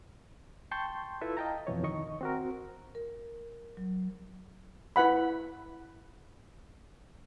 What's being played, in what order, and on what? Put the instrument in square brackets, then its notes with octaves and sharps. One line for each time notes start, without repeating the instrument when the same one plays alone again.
[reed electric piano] G5 A5 C6 C#6 G6
E4 F4 A4 B4 E5
D#5 F5 G5 A5 A#5
F2 B2 E3 C#5
D#3 D#5 C#6
C4 F#4 A#4
[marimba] A#4
F#3
[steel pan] E4 B4 F#5 B5